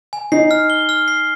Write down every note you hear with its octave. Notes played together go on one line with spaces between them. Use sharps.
G#5
D#4 C7
F6
G7
F6
C7